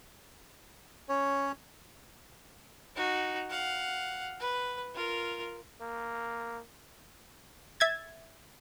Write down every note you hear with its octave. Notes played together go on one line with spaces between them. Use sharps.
C#4 C#5
D#4 F#4
F5 F#5
B4
F4 A#4
A#3
E5 G#6 A6